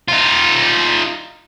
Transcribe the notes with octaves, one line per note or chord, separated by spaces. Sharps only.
D#4 F4